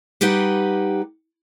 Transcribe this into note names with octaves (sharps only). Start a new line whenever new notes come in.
G3 D#4 G4 B4 F#5